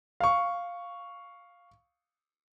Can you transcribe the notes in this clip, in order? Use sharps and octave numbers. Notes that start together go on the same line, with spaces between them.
F5 C#6